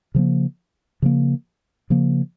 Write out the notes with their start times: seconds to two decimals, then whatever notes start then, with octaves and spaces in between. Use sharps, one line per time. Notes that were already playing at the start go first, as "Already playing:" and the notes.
0.15 C#3 F3 A#3
1.02 C#3 F3 A#3
1.90 C#3 F3 A#3